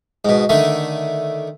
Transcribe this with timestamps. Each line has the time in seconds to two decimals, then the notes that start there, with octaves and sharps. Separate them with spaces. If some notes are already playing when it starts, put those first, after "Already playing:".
0.25 G#2 B2
0.49 D3 D#3 A3